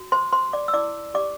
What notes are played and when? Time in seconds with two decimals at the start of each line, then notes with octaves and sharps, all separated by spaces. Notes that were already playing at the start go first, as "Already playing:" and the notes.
Already playing: F#4
0.12 C5 C6
0.33 C5 C6
0.53 D5 D6
0.68 E6
0.74 E4 D5 D6
1.14 G4 D5 D6